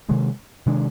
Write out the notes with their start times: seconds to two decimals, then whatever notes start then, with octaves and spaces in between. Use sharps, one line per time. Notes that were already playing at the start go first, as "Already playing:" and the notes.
0.08 C3 D#3 G#3 D4
0.66 C3 D#3 G#3 D4